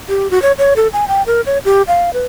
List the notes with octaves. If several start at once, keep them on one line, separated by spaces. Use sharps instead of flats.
G4
F#4
C#5
C#5
A4
G#5
G5
A#4
C#5
G4
F5
B4